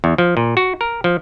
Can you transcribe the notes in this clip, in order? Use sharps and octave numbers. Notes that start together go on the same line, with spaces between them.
E2
F3
A#2
F#4
A#4
F3